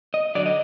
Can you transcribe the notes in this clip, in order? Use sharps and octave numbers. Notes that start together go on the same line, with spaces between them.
D#5
D3 F#3 D5
D#5